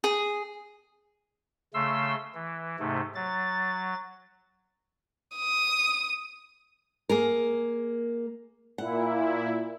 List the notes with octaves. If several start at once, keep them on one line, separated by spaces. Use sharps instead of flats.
G#4
C#3 A3 C6 E6
E3
G#2 C3 A3
F#3 A6
D#6
A#3 G#4 A#4
A#2 E4 F#5